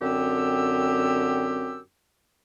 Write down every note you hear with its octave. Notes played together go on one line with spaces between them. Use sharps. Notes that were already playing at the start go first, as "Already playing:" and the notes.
F#2 D3 C4 G4 E6